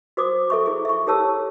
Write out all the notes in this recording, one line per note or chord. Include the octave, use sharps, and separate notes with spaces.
F#4 C5 D6 D#6
A4 E5 C#6
E4 G#4
E5 C#6
E4 G4 A4 C#5 A5 E6